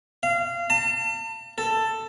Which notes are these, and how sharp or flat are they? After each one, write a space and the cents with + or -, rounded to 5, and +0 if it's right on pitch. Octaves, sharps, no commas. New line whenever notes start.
F5 -25
A5 +40
A4 +10